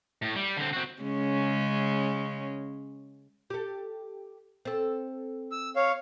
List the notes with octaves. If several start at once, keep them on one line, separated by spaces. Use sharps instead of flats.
A2
G3
D3 C4
C4 F#4
C#3 G#3 C#4
G4 A4
C4 A4
E6
C#5 F5